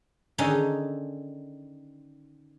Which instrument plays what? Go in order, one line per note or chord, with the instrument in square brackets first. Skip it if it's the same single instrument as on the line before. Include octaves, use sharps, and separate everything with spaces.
[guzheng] D3 D#3 C#4 D#4 G#4 A4